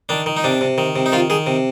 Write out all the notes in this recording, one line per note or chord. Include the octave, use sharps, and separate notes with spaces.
D#3 D4
D#3
D#4
C3 D4
C3
D#3
C3
D#4
D#3 F4
D#3 G#4
C3